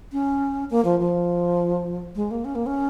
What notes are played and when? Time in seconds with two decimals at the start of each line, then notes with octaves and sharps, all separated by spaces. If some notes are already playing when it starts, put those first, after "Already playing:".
0.12 C#4
0.70 A#3
0.85 F3
1.00 F3
2.16 G#3
2.31 A#3
2.45 C#4
2.55 A#3
2.66 C#4